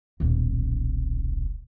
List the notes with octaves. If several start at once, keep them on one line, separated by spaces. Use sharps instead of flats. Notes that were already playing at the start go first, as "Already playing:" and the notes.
D#1 B1